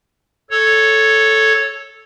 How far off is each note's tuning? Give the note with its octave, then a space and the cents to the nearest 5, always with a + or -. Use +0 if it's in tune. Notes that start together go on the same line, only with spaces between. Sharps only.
A4 +0 C#5 +0